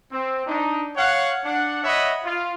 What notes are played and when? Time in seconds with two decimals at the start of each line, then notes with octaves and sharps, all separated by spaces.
0.12 C4
0.47 D4 D#4
0.96 C#5 F5 F#5
1.45 D4 F#5
1.84 C#5 D#5 E5 F#5 B5
2.24 F4